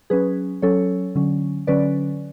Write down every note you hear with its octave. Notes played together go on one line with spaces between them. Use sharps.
F#3 C#4 G#4 B4
F#3 C#4 A4 C#5
D3 F#3 C#4
D3 F#3 C#4 B4 D5